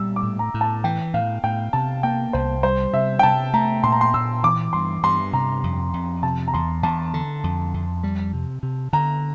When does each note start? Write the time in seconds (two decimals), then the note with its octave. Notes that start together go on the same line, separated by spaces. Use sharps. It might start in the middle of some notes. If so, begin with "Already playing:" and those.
Already playing: A#2 G3 E6
0.16 D6
0.23 A2
0.39 A#5
0.54 A2
0.61 A5
0.84 E3 G5
1.14 A2 F5
1.43 A2 G5
1.73 C3 A5
2.03 A#3 G5
2.33 C2 C5
2.63 G3 C5
2.93 C3 E5
3.19 G5
3.23 C3 A5
3.54 A3 A#5
3.83 A#2 C6
3.92 A#5
4.01 C6
4.14 A#2 E6
4.43 E3 D6
4.73 G2 C6
5.03 G2 C6
5.33 C3 A#5
5.64 F2
5.94 F2
6.23 C3 A5
6.48 A#5
6.54 E2 C6
6.83 E2 A5
7.14 D3
7.44 F2
7.74 F2
8.03 G3
8.33 C3
8.63 C3
8.93 D3 A#5